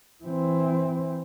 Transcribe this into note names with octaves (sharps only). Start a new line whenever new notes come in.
E3 C4